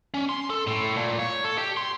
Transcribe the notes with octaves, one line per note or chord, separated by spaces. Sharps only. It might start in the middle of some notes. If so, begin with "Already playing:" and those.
C#4
C6
A4
A2
A#2
C#5
A4
G4
C6